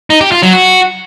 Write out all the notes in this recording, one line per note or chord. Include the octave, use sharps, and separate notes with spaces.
D#4
G4
F4
F#3
F#4